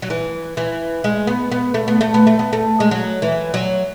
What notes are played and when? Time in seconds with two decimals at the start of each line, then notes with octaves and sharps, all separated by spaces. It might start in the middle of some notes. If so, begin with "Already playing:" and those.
0.02 F#3
0.10 E3
0.57 E3
1.04 G#3
1.27 B3
1.52 B3
1.74 A3
1.88 B3
2.01 A3
2.14 B3
2.27 A3
2.39 B3
2.53 A3
2.80 G#3
2.91 F#3
3.22 E3
3.54 F#3